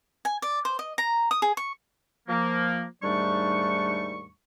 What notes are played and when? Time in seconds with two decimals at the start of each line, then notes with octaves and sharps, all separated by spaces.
0.25 G#5
0.42 D5
0.65 C5
0.79 D#5
0.98 A#5
1.31 D#6
1.42 G#4
1.57 C#6
2.28 F3 A#3
3.03 D#2 G#2 G3 A3 D4 C#6